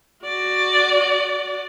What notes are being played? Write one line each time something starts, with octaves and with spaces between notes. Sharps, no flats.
F#4 D5